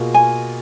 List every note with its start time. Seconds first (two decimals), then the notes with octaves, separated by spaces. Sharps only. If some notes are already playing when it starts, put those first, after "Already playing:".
Already playing: B2 A#3 F4 G#4
0.14 G#5